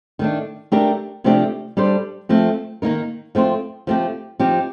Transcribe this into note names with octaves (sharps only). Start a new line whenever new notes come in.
D#3 A3 D4
A3 D4 G4 A#4
C3 F3 A3 D4 G4
G3 D4 A4 C5
F3 A3 C4
D#3 A#3 D#4 A#4
F3 A3 C4 F4
F3 A3 C4 G4
F3 C4 D#4 G4